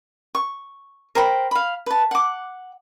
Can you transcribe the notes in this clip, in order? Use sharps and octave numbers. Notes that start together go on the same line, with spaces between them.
C#6
A#4 C5 G5 B5
F5 B5
B4 A5
F#5 D6